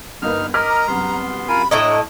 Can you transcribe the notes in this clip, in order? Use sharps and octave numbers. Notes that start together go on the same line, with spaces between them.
G1 A#3 D#4 B4 F6
A#4 D#5 D6 F6 B6
A#5
C2 F#2 B3 C6
F4 A#4 G#5 B5
A2 D4 E4 C#5 D#5 A#5